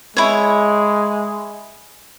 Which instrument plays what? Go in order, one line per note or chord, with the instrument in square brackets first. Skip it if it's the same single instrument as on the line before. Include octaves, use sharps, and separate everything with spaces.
[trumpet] G#3 [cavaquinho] E4 C#5